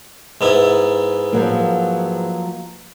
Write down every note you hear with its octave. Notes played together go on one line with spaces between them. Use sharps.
G#2 B3 E4
F3 F#3 A#3